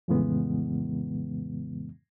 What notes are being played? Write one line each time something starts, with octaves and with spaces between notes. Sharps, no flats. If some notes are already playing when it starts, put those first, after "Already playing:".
F2 A2 C#3 E3 G#3 B3